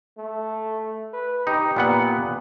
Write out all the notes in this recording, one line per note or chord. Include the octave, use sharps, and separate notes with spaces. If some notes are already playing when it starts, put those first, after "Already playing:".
A3
B4
D#4 G4
A#2 B3 F#5